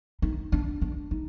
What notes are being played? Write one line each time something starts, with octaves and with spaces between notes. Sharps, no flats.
D#4
D4
D4
D#4